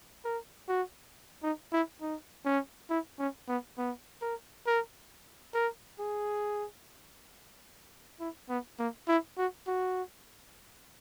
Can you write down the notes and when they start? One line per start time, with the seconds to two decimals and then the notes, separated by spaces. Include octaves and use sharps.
0.25 A#4
0.69 F#4
1.43 D#4
1.73 E4
2.02 D#4
2.46 C#4
2.90 E4
3.19 C#4
3.49 B3
3.78 B3
4.22 A#4
4.67 A#4
5.55 A#4
6.00 G#4
8.20 E4
8.50 B3
8.79 A#3
9.08 E4
9.38 F#4
9.67 F#4